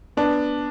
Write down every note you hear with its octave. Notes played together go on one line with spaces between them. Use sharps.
B3 D4